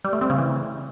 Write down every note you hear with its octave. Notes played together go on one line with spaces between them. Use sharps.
G3
A3
C4
C#3
E3